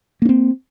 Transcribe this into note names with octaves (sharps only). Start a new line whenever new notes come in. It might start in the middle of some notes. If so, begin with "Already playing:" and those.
A#3 C4 D4